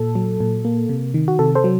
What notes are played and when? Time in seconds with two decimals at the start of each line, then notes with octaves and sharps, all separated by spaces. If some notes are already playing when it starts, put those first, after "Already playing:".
Already playing: A#2 A4
0.15 F#3
0.40 A#2
0.65 A#3
0.89 C3
1.14 D#3
1.28 F#4
1.39 C3 A4
1.55 A4 C5
1.64 F#3